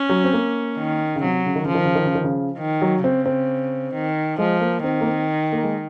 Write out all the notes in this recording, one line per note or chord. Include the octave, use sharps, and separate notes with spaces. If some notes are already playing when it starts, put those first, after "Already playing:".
Already playing: C#4
F#3
C4
A#3
D#3
C#3
C3 F#3
C#3
D#3
C#3 F3
D#3
C#3
D#3
C#3
D#3
C#3
D#3
F#3
C#3 C4
C4
D#3
F3 G#3
A#3
D#3 C4
A#3
C4
A#3
G#3